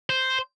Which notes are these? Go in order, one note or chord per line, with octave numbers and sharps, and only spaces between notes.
C5